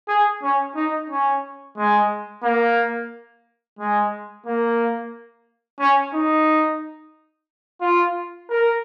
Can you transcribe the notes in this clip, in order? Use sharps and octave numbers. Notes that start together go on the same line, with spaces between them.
G#4
C#4
D#4
C#4
G#3
A#3
G#3
A#3
C#4
D#4
F4
A#4